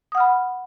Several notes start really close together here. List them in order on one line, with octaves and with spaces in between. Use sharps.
D#6 F#5 F6 B5